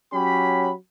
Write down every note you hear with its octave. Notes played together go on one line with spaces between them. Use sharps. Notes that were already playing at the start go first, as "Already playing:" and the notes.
F#3 C#4 G4 B5